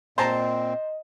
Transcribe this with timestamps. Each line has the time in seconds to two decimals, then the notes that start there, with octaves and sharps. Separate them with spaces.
0.18 A#2 C4 C5 D#5 A5 A#5